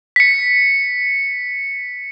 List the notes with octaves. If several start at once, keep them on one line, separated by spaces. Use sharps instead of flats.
B6 C#7